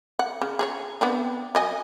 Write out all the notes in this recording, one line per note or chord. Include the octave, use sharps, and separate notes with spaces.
F#5
C#3
G#4 A4 C#5
B3 C4 D4
F#3 D#5 G#5